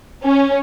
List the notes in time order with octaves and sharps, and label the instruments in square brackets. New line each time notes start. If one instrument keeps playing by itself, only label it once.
[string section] C#4